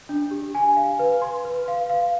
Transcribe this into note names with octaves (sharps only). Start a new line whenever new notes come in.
D4
G4
G#5
F5
B4
C6
B4
F5
F5